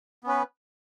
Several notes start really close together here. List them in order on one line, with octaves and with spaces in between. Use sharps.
B3 C#4 B4